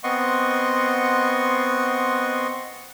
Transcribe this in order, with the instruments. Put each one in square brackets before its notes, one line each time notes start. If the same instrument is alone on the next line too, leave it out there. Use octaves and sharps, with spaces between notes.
[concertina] B3 C4 D#5 F#5 C6 C#6